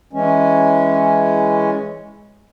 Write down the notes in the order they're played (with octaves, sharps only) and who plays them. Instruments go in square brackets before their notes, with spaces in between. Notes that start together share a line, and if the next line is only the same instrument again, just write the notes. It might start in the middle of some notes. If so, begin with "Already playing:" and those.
[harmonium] E3 G#3 C#4